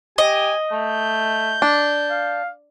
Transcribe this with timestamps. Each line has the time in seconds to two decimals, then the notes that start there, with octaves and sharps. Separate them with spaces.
0.18 G4 D#5 G#5
0.72 A3 G6
1.62 D4
2.10 F5